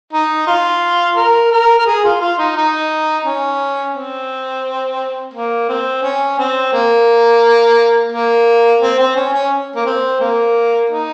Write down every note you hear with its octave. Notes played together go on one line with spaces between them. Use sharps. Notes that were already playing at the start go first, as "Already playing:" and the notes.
D#4
F4
A#4
A#4
A#4
G#4
F4
F4
D#4
D#4
C#4
C4
A#3
C4
C#4
C4
A#3
A#3
C4
C4
C#4
C#4
A#3
C4
A#3
D#4